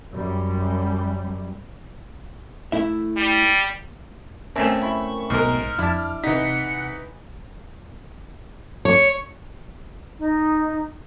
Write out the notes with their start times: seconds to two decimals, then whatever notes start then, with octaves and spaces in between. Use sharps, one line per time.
0.11 F#2 G3
2.72 A3 E4 E5
3.17 G3
4.56 G#1 A3 C4 C#4 A#4 E5 G#5
4.82 E4 B5 C#6
5.30 B1 G#2 B2 A#4 F6
5.79 F2 D4 E4 A5
6.23 C3 E3 D#4 F#5 B6
8.85 C#5
10.18 D#4